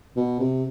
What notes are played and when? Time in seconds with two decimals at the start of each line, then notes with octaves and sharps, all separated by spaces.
0.16 B2
0.40 C3